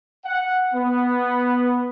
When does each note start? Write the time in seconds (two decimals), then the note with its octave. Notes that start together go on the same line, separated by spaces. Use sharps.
0.25 F#5
0.73 B3